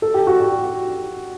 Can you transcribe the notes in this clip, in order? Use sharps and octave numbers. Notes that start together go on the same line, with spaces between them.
A4
G4
F#4
G4